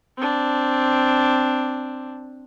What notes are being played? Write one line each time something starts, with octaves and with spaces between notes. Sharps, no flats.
C4 D4